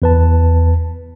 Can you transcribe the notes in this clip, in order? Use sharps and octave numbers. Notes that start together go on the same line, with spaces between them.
E2 B4 A5